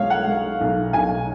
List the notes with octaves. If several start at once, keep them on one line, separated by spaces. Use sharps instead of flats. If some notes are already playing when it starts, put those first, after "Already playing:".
Already playing: B1 G#3 C#5 F5
F#5
G#3
B1
B1 G#5